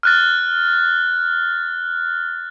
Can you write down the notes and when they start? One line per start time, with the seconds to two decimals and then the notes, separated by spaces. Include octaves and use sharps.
0.03 F6 F#6 A6